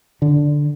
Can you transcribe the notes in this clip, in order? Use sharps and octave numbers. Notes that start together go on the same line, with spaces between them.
D3